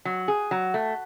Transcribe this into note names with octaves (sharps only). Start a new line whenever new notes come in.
F#3
G#4
F#3
A3